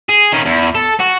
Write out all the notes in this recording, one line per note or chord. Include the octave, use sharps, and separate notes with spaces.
G#4
D#3 C#4
E2
A4
F#4